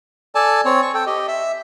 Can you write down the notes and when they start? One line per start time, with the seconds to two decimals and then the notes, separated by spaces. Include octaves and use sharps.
0.35 A4 D5 G#5 A5
0.65 C4 C#5
0.82 C#6
0.94 A4 G5
1.07 G4 D#5
1.28 E5